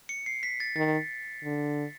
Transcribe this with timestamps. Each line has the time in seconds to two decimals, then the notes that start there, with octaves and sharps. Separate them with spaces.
0.09 C#7
0.26 C7
0.43 B6
0.60 A6
0.76 D#3 A6
1.44 D3